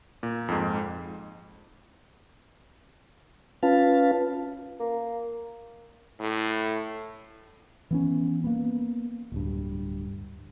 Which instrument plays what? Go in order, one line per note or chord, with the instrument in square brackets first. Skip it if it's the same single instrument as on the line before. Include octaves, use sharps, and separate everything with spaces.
[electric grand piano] A#2
F2 G#2
[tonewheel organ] C#4 F4 B4 F5 A5
[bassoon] A#3
[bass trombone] A2
[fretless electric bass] E3 B3 C#4
A#3 B3
D1 G2